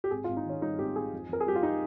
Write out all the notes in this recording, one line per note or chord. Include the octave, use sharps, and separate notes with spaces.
G4
G#1 G#4
G#1 F4
D#4
D#3 C#4
G2 D#4
G#1 G4
G#1 G#4
F2
F2 A#4
G#4
G3 G4
F4
D#4